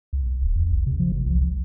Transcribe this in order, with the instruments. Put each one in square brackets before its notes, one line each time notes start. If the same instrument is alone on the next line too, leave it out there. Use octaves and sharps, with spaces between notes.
[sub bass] C#2
C2
D1
E2
A#1
C3
F3
G1
C2
C#2